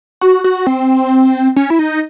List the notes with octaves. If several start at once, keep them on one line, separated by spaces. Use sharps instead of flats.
F#4
F#4
C4
C#4
E4
D#4